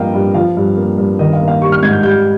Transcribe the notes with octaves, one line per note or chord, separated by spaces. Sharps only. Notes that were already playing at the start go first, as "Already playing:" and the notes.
Already playing: G2 F3 A#3 D#5 F5 G5
G2
F3 F5
G2
A#3
G2
D#3 D#5
F5
A#3
F5
G3 C#6
F6
G#2 G#6
G6
G3 G6